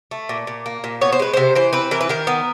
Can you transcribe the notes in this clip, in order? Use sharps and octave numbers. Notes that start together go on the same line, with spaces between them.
A3
A#2
A#2
A#3
A#2
B3 C#5
C5
G#3 B4
C3 C5
E3 C5
C4 B4
E3 A#4
B4
D#3 A#4
B3